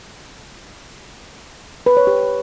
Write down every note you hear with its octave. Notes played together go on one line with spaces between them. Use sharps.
B4
C#5
G4